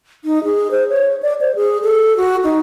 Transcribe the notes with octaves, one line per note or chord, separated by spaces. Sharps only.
D#4
G#4
C5
C#5
D5
C5
G#4
A4
F#4
D#4